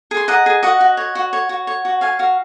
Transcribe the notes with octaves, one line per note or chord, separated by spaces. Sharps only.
G#4
C6
D#5 F#5 A#5
G#4
F#4 D#5 F#5
F#4
C#5
F#4
C#5
F#4
C#5
F#4
C#5 F5 G#5
F#4 F5